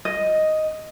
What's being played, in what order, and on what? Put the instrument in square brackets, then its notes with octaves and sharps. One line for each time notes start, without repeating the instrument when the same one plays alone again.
[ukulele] D#5